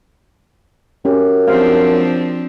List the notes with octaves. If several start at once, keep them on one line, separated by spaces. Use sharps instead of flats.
F#2 C#4 G4
F3 C4 D4 G4 C5 F5